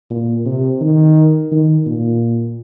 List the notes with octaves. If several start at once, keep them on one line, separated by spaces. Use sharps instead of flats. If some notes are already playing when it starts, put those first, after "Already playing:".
A#2
C3
D#3
D#3
A#2